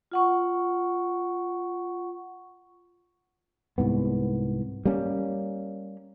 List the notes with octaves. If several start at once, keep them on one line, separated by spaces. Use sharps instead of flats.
F4 F#5 C#6
C2 G#2 B3
G3 A#3 C#4